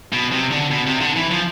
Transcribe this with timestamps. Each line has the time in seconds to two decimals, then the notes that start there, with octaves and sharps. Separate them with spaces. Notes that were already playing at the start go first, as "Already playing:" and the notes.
0.12 B2
0.32 C3
0.51 D3
0.71 B2
0.86 C3
1.01 D3
1.16 E3
1.31 F3